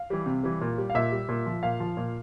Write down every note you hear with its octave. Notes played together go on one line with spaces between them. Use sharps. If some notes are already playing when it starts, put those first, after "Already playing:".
Already playing: F5
E3 G3
C3
E3 G3
A#2
G3
F5
A#2 E5
G3
A#2
F3
A#2 F5
F3
A#2